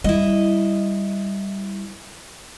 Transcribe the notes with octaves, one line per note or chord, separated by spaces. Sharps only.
G3 E4 D#5